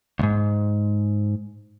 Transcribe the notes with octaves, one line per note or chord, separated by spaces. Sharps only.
C#2 G#2